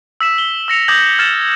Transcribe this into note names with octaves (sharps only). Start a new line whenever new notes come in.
E6 B6 E7
G7
E6 A#6 C#7 F7
D6 D#6 G6 G#6 A#6 F#7
F6 G#6 A6 C#7 E7 F#7